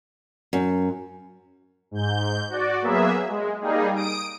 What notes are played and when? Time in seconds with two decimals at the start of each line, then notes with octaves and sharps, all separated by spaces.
0.53 F#2
1.91 G#2 G6
2.49 F#4 D5
2.81 F#3 A#3 B3 G#4 E5
3.29 G#3
3.61 G3 A#3 D#4 G#4
3.95 D#6 D7